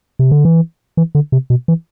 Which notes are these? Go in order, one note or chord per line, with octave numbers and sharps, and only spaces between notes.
C3
D3
E3
E3
D3
C3
B2
E3